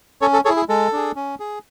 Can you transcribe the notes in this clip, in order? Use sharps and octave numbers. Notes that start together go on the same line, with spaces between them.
C#4 A4 C#5
A4
G#4 A4 C#5
E4
G#4
G#3 A4
D4 G#4
C#4
G#4